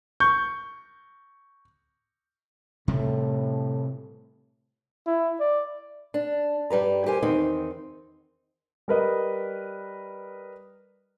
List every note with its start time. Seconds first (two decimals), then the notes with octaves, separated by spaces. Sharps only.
0.20 C#6 G6
2.88 A2 C3 G3 A3
5.07 E4
5.40 D5
6.14 D4
6.70 G2 G3 B4 A#5
7.06 G4 A#4 C5 G#5
7.23 E2 D#3 C4 D#4
8.88 G3 A#4 B4 D#5